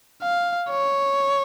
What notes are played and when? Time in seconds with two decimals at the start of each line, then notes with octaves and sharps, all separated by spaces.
0.22 F5
0.70 C#5